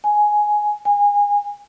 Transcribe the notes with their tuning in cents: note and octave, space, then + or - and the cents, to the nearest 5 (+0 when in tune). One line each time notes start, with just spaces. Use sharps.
G#5 +10
G#5 -25